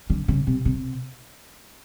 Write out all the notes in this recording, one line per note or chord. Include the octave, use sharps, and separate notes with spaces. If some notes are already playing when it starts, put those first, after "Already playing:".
D3
C#3
C3
C3